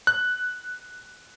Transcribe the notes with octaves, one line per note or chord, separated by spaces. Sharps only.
F#6